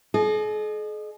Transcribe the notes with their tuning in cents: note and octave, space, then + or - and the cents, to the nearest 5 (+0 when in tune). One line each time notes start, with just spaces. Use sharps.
G#4 +45 D#5 -30